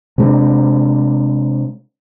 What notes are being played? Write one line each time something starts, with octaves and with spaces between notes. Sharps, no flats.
C3 G#3 D4